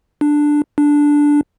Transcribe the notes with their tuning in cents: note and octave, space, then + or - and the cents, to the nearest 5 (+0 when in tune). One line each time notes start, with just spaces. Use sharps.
D4 +5
D4 -5